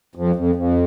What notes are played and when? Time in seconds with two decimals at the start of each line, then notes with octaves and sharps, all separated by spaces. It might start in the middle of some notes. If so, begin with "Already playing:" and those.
0.15 F2
0.36 F2
0.55 F2